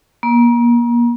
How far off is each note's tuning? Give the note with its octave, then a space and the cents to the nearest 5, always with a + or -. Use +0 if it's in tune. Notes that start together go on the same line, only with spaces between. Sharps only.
A#3 +35